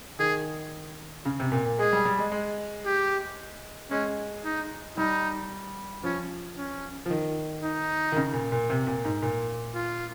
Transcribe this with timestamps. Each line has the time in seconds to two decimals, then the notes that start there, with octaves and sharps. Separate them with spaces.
0.19 D#3 G#4
1.25 C#3
1.40 C3
1.52 A#2
1.65 A#2
1.79 G#3 G#4
1.93 G3
2.05 G3
2.18 G#3
2.32 G#3
2.86 G4
3.91 G#3 C#4
4.45 D#4
4.97 G3 D#4
6.03 F3 C#4
6.57 C#4
7.06 F3
7.10 D#3
7.62 D#4
8.12 D#3
8.16 C#3
8.33 A#2
8.52 A#2
8.70 C3
8.87 A#2
9.05 G#2
9.22 A#2
9.75 F4